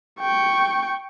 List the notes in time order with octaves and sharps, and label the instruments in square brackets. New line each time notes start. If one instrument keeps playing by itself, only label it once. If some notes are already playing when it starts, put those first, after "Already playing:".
[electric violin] G5 C#6